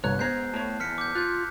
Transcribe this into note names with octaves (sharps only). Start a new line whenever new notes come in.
G1 C2 C#5 A#5 F#6
G#3 B3 C5 A#5 G6 G#6 C7
A2 C#5 A5
E2 D#3 F6 B6 C#7
D6 G6
F4 F#6 G6